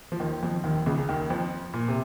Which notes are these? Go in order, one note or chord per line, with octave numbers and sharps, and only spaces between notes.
F3
D#2 D#3
F2 F3
D#2 D#3
C#2 C#3
C#3
D#2 D#3
F2 F3
A#2
C3